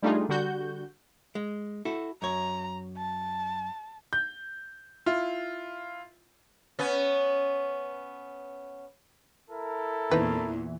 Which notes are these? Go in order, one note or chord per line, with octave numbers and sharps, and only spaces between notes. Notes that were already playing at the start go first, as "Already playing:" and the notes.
G3 A3 D4 D#4 F4 G#4
D3 G3 F#4 G6
G#3
E4 F#4 A4
F#2 C#5 A#5
A5
G6
E4 F4
B3 C#4
E4 A4 A#4
E2 A#2 E3 C4 D#4 B4